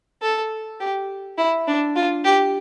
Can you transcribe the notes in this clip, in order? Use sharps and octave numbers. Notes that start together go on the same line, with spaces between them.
A4
G4
E4
D4
F4
G4